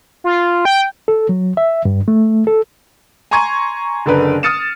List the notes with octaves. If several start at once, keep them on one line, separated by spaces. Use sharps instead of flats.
F4
G5
A4
F#3
E5
G2
A3
A4
G#5 A#5 C6 C#6 G#6 D#7
F#1 D3 A#4 B4
D#6 F6 A6 C#7 D#7 E7